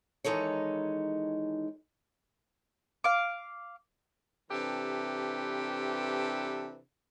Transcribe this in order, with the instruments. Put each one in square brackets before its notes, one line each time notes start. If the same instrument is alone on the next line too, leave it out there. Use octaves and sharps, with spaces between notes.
[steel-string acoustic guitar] D#3 E3 G#3 D#4 A4 C#5
[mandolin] F5 D6
[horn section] C3 E3 D4 G4 A4 B4